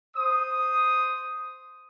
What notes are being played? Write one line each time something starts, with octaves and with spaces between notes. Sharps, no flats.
C5 D#6